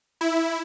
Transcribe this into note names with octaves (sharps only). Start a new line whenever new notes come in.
E4